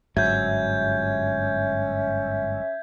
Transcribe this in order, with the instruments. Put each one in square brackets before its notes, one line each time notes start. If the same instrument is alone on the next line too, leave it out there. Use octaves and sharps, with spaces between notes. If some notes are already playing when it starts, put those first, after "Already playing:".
[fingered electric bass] G1 G#2 F#3 [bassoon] C#4 [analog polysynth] E5 [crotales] G6 G#6